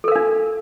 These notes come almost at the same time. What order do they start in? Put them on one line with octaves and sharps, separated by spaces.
A4 A#4 F5 D4